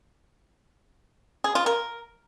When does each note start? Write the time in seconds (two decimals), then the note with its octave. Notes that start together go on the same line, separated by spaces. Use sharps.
1.44 G#4
1.55 F4
1.66 A#4